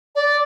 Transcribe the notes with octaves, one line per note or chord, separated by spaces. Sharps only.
D5